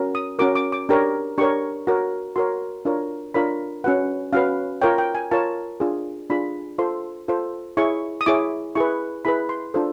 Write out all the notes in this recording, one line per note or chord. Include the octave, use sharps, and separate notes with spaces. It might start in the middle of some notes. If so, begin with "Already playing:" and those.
Already playing: C#4 F#4 A#4
D#6
C#4 F#4 A#4 D6
D6
D6
D4 G4 A#4 C#5
D4 G4 A#4 C#5 C#6
F#4 A#4 C#5
F#4 A#4 C#5 C6
D4 F4 A#4 C#5
D4 F4 A#4 C#5 B5
C#4 F#4 B4 F#5
C#4 F#4 B4 F5
F4 A#4 C#5 G5
G5
G#5
F4 A#4 C#5 A5
D4 F4 G#4
D4 F4 G#4 B5
F4 A4 C5 C6
F4 A4 C5
E4 G#4 C#5 C#6
D#6
E4 G#4 C#5 D6
E4 G#4 B4 C#6
E4 G#4 B4 B5
C6
D4 F4 A4 C5